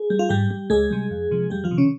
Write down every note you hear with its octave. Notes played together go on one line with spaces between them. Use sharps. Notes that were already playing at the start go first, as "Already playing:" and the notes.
Already playing: G#4
G3
F4
G#2 G3 G4
G3
C#2 G#3 G#4
C3 G3
F2
C3 F3
F2 G3 G4
F3 F4
C3 D#3
C#3 C#4